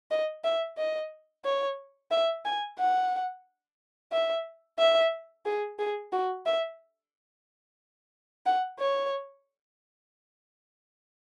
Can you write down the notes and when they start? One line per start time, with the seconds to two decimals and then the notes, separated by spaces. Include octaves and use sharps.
0.11 D#5
0.44 E5
0.78 D#5
1.45 C#5
2.11 E5
2.45 G#5
2.79 F#5
4.12 E5
4.79 E5
5.46 G#4
5.79 G#4
6.12 F#4
6.46 E5
8.46 F#5
8.79 C#5